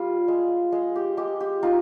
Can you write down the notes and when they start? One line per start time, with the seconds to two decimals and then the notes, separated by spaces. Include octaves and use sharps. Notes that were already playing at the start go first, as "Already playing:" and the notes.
Already playing: G3 F4
0.28 G#3
0.72 G#3
0.95 G4
1.17 G#3 G4
1.40 G4
1.63 D#4 F4